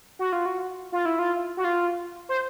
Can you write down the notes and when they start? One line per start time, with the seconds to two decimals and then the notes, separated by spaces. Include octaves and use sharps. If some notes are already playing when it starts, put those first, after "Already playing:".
0.19 F#4
0.33 F4
0.46 F#4
0.92 F4
1.05 E4
1.19 F4
1.57 F#4
1.64 F4
2.29 C5